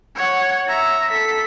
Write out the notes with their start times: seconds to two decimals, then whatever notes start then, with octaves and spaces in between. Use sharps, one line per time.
0.16 C#5 F#5
0.68 E5 A#5
1.11 A4 B6